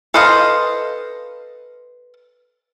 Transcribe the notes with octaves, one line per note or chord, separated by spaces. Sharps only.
A4 B4 C5 D#5 F5